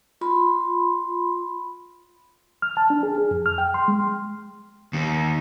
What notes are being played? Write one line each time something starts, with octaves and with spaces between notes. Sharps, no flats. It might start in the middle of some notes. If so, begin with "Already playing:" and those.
F4 B5 C6
F6
A5
D4
G#4
G#4
F2
F6
G5
C6
G#3
D#2